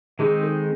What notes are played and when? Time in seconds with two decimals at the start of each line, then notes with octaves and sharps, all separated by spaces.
0.19 D#3 G#3 C4 D#4 G#4
0.43 A4